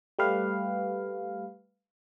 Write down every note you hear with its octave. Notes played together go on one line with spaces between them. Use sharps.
G3 A3 G4 B4 F5